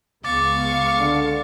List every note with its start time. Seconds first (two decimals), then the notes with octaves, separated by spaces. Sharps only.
0.24 C#2 G#3 B3 F5 C#6 D6 A6
0.98 D3